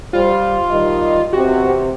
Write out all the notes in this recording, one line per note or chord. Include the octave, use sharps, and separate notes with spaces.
G3 F4 C5
D#3 G3 D#5
E2 C3 F#4 G4